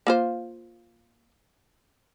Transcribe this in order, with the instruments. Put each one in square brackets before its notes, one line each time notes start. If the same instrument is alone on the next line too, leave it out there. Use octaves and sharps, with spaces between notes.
[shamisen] A#3 F4 C5